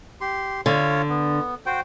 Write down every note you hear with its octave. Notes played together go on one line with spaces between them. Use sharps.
G4 C6
D3 F4 C#5
B3
F#4 C5 G5